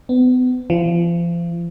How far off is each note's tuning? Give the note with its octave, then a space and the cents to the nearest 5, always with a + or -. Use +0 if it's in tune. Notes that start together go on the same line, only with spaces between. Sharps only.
B3 +35
F3 -35